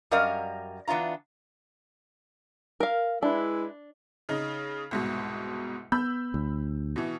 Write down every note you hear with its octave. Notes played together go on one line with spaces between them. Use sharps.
F#2 G3 A#4 D#5 F5
E3 B3 D4 F4 A#5
A#4 F5
G#3 D4 E4 B4
C#3 D#4
C2 G#2 B2
B3 B5 E6 G6
D2
B2 E3